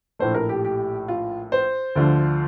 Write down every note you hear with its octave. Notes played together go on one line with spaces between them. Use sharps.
A#1 A2 A3 C5
A#4
G4
G4
F4
C5
D2 D3 F3